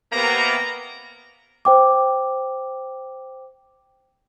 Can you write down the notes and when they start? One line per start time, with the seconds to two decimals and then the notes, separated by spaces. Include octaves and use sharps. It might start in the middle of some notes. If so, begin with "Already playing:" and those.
0.12 C3 A#3 B3 A#5
1.65 C5 G5 D6